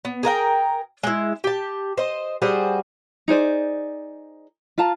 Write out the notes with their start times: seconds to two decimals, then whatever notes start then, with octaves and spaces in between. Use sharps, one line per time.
0.05 B3
0.23 G#4 A#4 F5 G5
1.03 G#3 E4
1.44 G4 A5
1.98 C5 D#5
2.42 G3 F#4 G#4 C5
3.28 D#4 G#4 C5 D5
4.78 F4 F5 A5 A#5